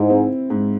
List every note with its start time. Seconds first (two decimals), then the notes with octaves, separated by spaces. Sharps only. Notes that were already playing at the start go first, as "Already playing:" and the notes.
Already playing: G#2 E4
0.10 C4
0.50 G#2